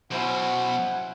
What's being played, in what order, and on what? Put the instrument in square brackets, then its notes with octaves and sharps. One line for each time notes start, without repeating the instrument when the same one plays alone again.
[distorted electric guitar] B2 F#3 [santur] C#4 E4 C5 [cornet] F#5